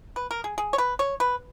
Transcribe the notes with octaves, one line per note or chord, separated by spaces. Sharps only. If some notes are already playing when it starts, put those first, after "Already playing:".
B4
A#4
G#4
G#4
C#5
B4
C#5
B4